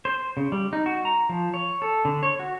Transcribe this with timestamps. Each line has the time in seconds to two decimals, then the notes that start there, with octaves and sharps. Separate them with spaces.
0.05 C5
0.37 C#3
0.52 G3
0.73 D#4
0.86 F#4
1.05 A#5
1.29 F3
1.54 C#5
1.82 A4
2.05 D3
2.23 C#5
2.39 F#4